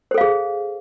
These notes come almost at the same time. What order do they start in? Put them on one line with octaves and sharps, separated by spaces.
C5 A4 F5 G#4